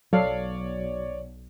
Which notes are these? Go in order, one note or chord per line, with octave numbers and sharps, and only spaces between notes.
B1 F#3 A4 C#5 D5 F5